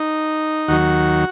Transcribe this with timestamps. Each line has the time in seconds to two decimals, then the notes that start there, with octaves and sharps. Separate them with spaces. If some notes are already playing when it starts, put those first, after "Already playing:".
Already playing: D#4
0.68 D#2 D#3 F#3 F#4